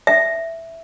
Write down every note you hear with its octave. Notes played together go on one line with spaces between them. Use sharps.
E5